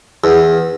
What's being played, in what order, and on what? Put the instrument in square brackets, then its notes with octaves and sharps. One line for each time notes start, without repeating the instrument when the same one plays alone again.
[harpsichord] E2